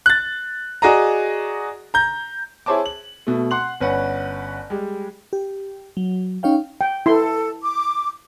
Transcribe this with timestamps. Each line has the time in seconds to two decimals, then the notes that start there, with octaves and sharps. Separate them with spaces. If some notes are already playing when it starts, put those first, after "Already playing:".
0.06 F#6 A6
0.82 F#4 G#4 D5 D#5 A#5
1.94 A#5 G6
2.66 E4 G#4 C5 C#5 A5 D6
2.86 F#7
3.27 B2 A3
3.51 F#5 C6 F#6 F#7
3.81 G1 C#4 B4 F#5
4.70 G3 G#3
5.33 G4
5.97 F#3
6.43 C#4 D#4 C#5 F5 G5
6.81 G5
7.06 E4 A4 C6
7.61 D6